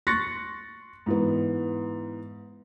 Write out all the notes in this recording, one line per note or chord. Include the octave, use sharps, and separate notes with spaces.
C6 C#6 F#6 A6 A#6 C#7
G#2 E3 B3